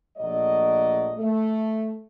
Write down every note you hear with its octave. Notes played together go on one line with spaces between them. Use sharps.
A#1 F#3 A3 D5 D#5
A3